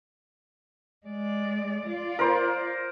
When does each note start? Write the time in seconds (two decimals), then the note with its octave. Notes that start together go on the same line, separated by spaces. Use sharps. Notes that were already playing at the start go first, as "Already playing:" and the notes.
1.07 G#3 D5
1.88 F4 D5
2.19 A#4 C5